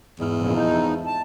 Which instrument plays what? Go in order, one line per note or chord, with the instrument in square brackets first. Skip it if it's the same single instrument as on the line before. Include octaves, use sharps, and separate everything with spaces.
[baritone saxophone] E2 [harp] G#2 E4 F6
[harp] F1 A#1 [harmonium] A#2 C#3
[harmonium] D#4 [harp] F5 A5 G6
[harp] E5
[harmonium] A5